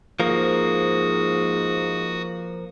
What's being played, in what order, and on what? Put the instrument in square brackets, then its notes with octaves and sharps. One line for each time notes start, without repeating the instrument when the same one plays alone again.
[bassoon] G#2 [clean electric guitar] F3 A#3 [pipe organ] F#4 D#6